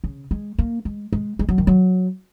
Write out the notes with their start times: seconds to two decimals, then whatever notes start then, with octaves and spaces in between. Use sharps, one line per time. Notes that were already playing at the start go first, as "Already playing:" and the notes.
0.04 C#3
0.31 G#3
0.59 A#3
0.85 G#3
1.13 G#3
1.39 G#3
1.49 F#3
1.58 D#3
1.67 F#3